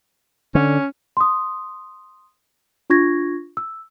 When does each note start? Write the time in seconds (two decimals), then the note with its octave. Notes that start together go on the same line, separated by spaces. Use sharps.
0.55 D3 C#4
1.17 C6 D#6
2.90 D4 F4 C#6 G#6 A#6
3.57 E6